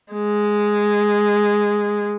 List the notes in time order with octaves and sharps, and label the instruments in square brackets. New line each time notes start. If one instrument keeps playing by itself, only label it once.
[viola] G#3